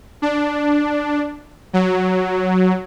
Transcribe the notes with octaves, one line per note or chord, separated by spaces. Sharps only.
D4
F#3